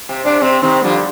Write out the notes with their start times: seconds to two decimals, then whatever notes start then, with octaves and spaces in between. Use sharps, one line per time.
0.09 C3
0.25 C3 D4
0.42 C3 C4
0.62 C3 D#3 C4
0.83 D3 F3 G3